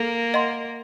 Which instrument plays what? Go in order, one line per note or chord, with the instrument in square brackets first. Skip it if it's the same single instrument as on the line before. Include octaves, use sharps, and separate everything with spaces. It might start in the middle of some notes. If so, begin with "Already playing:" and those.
Already playing: [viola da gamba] A#3 [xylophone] A4
[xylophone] D#5 F#5 C6